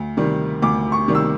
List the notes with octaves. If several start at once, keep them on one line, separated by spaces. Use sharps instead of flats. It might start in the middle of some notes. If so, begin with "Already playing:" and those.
Already playing: D2
C3 D#3 G3
D2 D6
C#6
C3 D#3 G3
E6